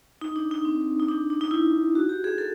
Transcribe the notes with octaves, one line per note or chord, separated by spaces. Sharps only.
D#4
D4
D#4
C4
D#4
D4
D4
D#4
E4
F#4
G4
G#4
A4